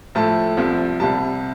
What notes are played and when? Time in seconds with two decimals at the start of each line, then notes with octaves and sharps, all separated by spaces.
0.15 A2 F3 A3 A5
0.57 C2 C3 F3
1.00 C2 C3 G3 A5